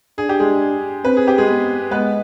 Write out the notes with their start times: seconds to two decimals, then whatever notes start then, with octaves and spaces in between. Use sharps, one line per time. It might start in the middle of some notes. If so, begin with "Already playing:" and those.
0.18 D4 G#4
0.29 G4
0.40 G#3 G#4
1.05 C4 B4
1.17 G#4
1.28 G4
1.38 G#3 G#4
1.48 B3
1.91 G#3 B3 B4